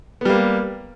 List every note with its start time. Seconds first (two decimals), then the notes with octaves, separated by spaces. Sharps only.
0.21 B3
0.25 G3
0.30 A#3